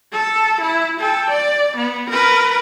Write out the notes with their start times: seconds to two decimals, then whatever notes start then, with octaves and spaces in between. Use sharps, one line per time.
0.12 A4
0.61 E4
1.00 A4 G5
1.30 D5
1.77 B3
2.10 A#4 B4